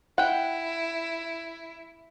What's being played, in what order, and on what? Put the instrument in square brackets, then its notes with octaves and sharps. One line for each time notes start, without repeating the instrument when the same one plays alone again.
[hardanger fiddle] E4 [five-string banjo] F#5 G5